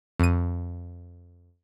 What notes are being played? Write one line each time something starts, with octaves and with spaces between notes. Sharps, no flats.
F2 D#7